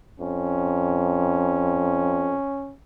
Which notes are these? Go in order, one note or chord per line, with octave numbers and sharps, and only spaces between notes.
F2 C#4